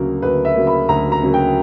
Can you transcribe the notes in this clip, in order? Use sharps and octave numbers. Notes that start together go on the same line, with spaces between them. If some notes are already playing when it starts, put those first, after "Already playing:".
Already playing: D2 C#3 F#3 A#3 A#4
D2 B4
E5
C#3 F#3 A#3
B5
D2 A#5
A#5
C#3 F#3 A#3
G5